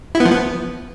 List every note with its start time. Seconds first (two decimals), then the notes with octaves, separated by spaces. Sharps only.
0.15 E4
0.20 B3
0.25 F3
0.31 B3